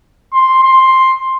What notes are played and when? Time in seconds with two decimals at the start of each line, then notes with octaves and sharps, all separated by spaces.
0.34 C6
0.63 C6